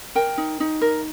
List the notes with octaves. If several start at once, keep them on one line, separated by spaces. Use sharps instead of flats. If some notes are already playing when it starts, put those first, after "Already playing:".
A#4 G5
D#4
D#4
A#4